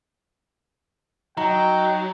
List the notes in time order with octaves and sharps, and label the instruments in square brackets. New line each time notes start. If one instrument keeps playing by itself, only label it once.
[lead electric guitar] F#3 [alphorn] D#4 [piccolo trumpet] G5 [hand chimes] A#5